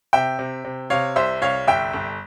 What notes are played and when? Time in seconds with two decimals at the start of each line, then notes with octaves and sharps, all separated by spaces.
0.13 C3 E5 G5
0.39 C3
0.65 C3
0.90 C3 C#5 F5
1.16 C2 C5 E5
1.42 C2 C#5 F5
1.68 G1 E5 G5
1.94 G1